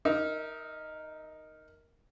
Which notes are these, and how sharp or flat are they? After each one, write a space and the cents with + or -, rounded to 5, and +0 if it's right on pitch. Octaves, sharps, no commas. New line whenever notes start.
D#4 +0 A#4 +0 E5 -35